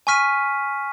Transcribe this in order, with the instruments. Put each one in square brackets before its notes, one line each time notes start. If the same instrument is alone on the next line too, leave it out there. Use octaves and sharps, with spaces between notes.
[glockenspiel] G#5 C#6 F6 B6 D#7